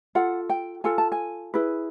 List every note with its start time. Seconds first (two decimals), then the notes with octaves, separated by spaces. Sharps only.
0.15 F4 A4 F#5
0.50 G5
0.84 F4 A4 G#5
0.98 A5
1.12 G#5
1.54 E4 G#4 B4